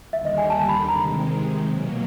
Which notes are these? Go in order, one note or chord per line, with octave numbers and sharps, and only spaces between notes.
D#2 D3 G3 E5
D#5
G#5
A5
B5
C3 D#3 G#3 A#5
B2 F#3 A#3